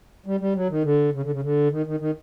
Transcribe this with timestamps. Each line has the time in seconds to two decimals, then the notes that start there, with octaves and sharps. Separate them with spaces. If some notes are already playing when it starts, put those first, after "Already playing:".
0.26 G3
0.40 G3
0.55 F#3
0.70 D#3
0.84 D3
1.13 C#3
1.23 D3
1.32 C#3
1.42 D3
1.71 D#3
1.86 D#3
2.00 D#3